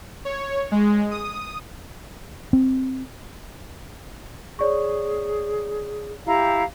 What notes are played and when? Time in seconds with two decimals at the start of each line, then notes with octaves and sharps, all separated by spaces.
0.25 C#5
0.71 G#3
1.11 D#6
2.53 C4
4.59 G#4 C#5 D5 C#6
6.26 E4 G4 F5 A#5